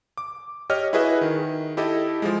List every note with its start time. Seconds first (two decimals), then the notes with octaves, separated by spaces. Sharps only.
0.17 D6
0.70 G4 C#5 D#5 F6
0.93 E4 F#4 G#4 B4 D#5 E5
1.21 D#3
1.77 E4 G4 A4 D#5
2.22 F3 G#3